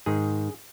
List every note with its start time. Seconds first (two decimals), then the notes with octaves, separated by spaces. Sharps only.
0.06 G#2 D#3 G#4